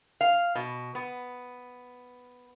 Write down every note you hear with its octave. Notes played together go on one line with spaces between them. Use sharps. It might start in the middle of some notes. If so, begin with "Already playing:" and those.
F5
B2
B3